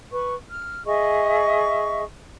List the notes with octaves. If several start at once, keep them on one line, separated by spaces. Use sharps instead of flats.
B4 C#6
F6
G#4 D#5 E5 C#6